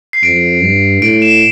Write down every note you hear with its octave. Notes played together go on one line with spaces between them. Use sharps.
C7
F2 D7
G2
A2 D7
E7